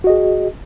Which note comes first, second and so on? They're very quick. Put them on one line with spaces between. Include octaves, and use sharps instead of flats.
F#4 D#5 G#4